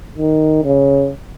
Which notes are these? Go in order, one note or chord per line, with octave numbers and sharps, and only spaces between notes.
D#3
C#3